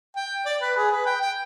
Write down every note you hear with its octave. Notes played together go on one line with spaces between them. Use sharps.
G5
D5
B4
G#4
B4
G5
G5